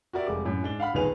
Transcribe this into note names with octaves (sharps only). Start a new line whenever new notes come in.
F#4 G4 A#4 D5 E5
F1 G3 G#3 D6
F#2 A2
G#2 D4 G7
F5 F#5 B5 F6
D#1 B1 D#3 G#4 B4 F7